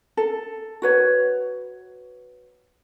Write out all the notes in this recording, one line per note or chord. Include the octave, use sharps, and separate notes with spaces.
A4
F#4 B4 C#5